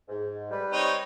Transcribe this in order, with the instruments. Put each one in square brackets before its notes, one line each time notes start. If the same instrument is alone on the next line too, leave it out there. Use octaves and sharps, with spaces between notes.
[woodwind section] G#2
G3 B4
[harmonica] C4 D#4 C#5